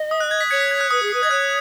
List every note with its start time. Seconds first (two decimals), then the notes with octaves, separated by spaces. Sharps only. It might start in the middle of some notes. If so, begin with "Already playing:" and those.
Already playing: D#5
0.11 D#6
0.20 F#6
0.31 G#6
0.41 B6
0.50 C#5 G#6 C#7
0.61 B6
0.71 G#6
0.81 F#6
0.91 B4 D#6
1.02 G#4
1.13 B4
1.23 D#5 G#6
1.30 C#5 F#6